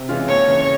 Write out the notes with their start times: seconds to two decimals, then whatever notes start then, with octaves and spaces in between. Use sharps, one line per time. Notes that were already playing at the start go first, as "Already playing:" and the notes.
Already playing: C3
0.09 E3 G#3 C#4 F4
0.28 D#2 C#5
0.48 C#3 E3